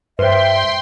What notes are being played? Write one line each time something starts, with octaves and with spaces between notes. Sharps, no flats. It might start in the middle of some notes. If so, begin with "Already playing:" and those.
G2 B4 C5 E5 G5 C6